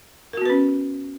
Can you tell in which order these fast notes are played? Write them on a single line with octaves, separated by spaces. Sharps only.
A#4 F#4 B3 B4 C#4